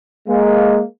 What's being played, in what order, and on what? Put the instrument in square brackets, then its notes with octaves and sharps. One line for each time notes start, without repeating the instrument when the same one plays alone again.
[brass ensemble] G#3 A#3